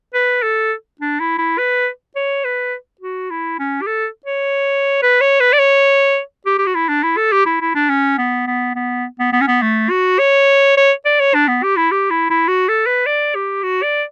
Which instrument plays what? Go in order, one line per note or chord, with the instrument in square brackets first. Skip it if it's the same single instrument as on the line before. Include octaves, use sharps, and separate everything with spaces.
[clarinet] B4
A4
D4
E4
E4
B4
C#5
B4
F#4
E4
C#4
G4
A4
C#5
B4
C#5
B4
D5
C#5
G4
G4
F#4
E4
D4
E4
A4
G4
E4
E4
D4
C#4
B3
B3
B3
B3
B3
C#4
B3
A3
F#4
C#5
C#5
D5
C#5
D4
B3
G4
E4
G4
E4
E4
F#4
A4
B4
D5
G4
F#4
D5